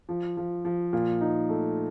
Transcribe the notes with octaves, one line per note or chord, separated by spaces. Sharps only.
F3
F3
F3
A#2
D#4
A3